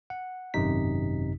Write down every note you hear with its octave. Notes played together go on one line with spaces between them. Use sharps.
F#5
G#1 F#2 C3 D#4 B6